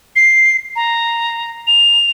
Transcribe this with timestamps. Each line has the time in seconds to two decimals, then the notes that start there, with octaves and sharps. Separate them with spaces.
0.16 C7
0.76 A#5
1.67 F7